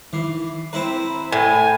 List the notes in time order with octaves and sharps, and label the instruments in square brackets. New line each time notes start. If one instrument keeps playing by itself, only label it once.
[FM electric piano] D#3 D6 C7 [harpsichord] E3
[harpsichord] C4 E4 B4 [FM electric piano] A#5 B5
[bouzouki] A2 [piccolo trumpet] G#5